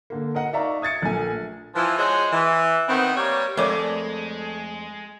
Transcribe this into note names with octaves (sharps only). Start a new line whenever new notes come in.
D3 A#3
A#4 D#5 F#5
D#4 D5 E5 F5 A#5 C#6
D#6 G#6 A6 C#7
A#1 A3 G#5
E3 F3
G#3 F#4 G#4 C5 C#5 D#5
E3
D#3 B3 C4
G3 A#3 C#5
F2 G#3 A3 A#4 C#5 D5 D6